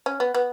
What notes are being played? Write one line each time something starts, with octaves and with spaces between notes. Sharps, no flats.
C#4
B3
B3